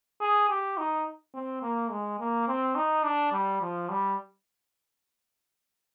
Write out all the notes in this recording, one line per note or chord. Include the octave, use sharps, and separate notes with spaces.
G#4
G4
D#4
C4
A#3
G#3
A#3
C4
D#4
D4
G3
F3
G3